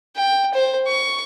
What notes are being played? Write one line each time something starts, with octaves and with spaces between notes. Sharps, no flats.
G5
C5
C#6